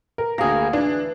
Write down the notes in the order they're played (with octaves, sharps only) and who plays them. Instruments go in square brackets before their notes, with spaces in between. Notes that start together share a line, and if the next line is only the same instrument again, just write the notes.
[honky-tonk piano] A#4
[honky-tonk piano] D2 A#6 [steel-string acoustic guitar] A#3 G#4
[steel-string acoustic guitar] E3 [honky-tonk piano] D4